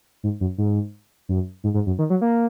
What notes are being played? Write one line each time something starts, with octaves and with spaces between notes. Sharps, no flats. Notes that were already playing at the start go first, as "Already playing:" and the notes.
G#2
F#2
G#2
F#2
G#2
G#2
F#2
D#3
F#3
A#3